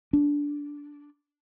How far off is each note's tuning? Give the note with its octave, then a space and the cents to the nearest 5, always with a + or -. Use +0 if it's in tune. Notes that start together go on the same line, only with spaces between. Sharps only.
D4 -15